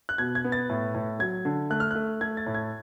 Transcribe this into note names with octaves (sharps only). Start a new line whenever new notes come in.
F#6
B2 G#6
G#6
B3
A6
A2
A2
F#3 G#6
D3
A3 F#6
F6
A3 F#6
A3 G#6
A6
A2
G#6